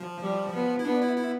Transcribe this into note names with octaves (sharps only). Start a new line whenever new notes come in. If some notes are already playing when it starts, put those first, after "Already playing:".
Already playing: F3
G3
B3
E4
B3 D4
E4
E4